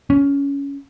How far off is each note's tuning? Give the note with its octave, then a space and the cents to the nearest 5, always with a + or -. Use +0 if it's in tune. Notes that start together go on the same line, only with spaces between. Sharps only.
C#4 +15